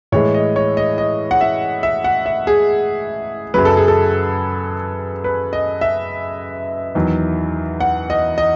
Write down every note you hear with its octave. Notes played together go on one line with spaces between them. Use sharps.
A2 E3 G#3 C#5
D#5
C#5
D#5
D#5
F#5
E5
E5
F#5
E5
G#4
F#2 C#3 F#3 B4
A4
G#4
A4
B4
D#5
E5
E2 D#3 F#3
F#5
D#5
D#5